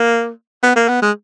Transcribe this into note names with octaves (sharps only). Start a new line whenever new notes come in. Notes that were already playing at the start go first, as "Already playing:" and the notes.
Already playing: A#3
B3
A#3
B3
G#3